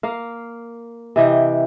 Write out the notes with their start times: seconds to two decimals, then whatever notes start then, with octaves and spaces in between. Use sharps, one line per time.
0.03 A#3 F5
1.16 C3 E3 D#5 G5